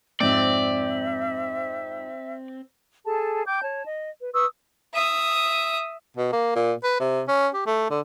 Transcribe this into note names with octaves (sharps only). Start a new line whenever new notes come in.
F2 G#2 C4 D5 E5
G#4 A4 A5
G5 D6 G6
C#5 A5
D#5
B4
B4 C#6 D#6 E6
E5 D#6
B2
A#3
A#2
B4
C3
C#4
G4
A3
D3